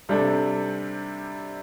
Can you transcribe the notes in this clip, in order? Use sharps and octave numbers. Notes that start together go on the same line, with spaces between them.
C3 G3 D4 A4